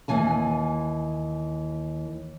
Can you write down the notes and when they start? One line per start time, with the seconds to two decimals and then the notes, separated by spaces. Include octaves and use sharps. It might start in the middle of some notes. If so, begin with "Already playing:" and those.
0.08 D#2 E3 G#5 A5